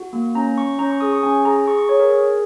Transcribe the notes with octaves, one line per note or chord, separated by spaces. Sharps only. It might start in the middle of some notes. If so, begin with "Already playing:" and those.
Already playing: F#4
A#3
C#4 A#5
C#4 C#6
C#4 A#5
C#6
G#4 D#6
C#6
C#4 G#5
G#4 A#5
G#4 C#6
C#6
G#4 C#5
A#4
G#4